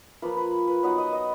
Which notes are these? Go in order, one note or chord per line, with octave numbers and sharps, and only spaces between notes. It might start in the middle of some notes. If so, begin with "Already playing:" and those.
F3 A#3 F4 B4
B4
B4
F#3 B3 D#4 B4
D#5
D#5